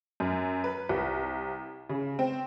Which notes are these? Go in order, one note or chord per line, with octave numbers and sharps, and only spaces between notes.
F#2
B4
C2
C#3
C4